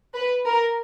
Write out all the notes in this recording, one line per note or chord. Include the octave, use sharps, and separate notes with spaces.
B4
A#4